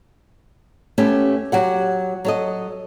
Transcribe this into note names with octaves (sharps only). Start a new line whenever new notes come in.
A3 B3 C#4 G4
F#3 G4 F#5
F#3 A4 D#5